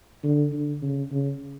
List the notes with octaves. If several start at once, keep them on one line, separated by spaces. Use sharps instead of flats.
D3
D3
C#3
C#3